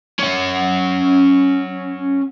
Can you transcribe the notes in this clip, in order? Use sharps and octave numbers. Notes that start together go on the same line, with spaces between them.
C#4 F#5